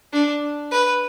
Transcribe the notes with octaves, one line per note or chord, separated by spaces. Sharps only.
D4
B4